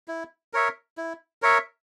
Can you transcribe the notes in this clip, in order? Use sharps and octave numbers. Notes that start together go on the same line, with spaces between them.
E4
A#4 C#5 E5
E4
A#4 C#5 E5